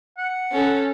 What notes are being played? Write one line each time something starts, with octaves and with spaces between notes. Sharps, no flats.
F#5
C#4 A4